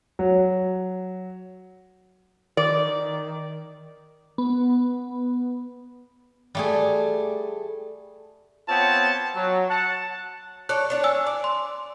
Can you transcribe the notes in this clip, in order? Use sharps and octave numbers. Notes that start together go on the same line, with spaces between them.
F#3
D#3 D5
B3
G3 A3 G#4
B3 C4 F4 C#5 G5 A5
F#3
F#5 A5
A4 C#5 D5 F#6
D4 C#5
G#5 E6
D5
C6